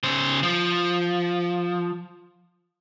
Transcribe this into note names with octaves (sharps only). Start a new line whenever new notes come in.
C#3 C5
F3